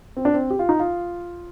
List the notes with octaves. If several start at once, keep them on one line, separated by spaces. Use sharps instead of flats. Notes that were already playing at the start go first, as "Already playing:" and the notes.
C4
D4
C4
G4
F4
D#4
F4